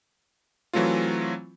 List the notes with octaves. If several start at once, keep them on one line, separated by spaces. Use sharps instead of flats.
E3 F#3 A3 C4 F4